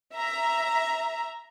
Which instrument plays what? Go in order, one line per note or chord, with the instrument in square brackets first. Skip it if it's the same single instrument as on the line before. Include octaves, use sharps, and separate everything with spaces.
[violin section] E5 A#5